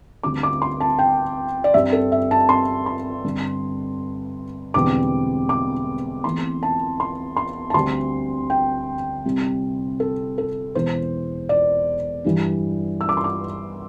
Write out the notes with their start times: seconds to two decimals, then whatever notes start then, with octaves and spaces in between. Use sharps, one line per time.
0.23 D2 D3 G3 C4 D6
0.43 D6
0.62 C6
0.80 A5
0.99 G5
1.64 D5
1.74 G2 G3 C4 E5
1.93 A4
2.12 E5
2.31 A5
2.49 C6
2.86 C6
3.25 G2 D3 C4
4.74 E1 E2 D3 G3 C4 D6
5.49 D6
6.24 E2 E3 A3 C4 C6
6.63 A5
7.00 C6
7.36 C6
7.70 A5
7.74 D2 D3 G3 C4 C6
8.50 G5
9.25 C2 C3 G3
10.00 A4
10.38 A4
10.75 E1 E2 E3 C5
11.49 D5
12.24 G2 E3 G3 D4
13.01 E6
13.09 D6
13.17 C6
13.24 D6